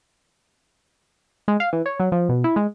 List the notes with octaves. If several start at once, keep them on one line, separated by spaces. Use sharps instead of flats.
G#3
F5
E3
C#5
F#3
F3
B2
E4
G#3